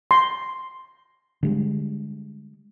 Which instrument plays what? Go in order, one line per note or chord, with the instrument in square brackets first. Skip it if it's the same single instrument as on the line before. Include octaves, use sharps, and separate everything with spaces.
[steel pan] C6
[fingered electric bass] D3 G3 G#3